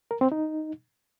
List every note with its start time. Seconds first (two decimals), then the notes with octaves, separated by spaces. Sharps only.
0.11 A#4
0.21 C4
0.32 D#4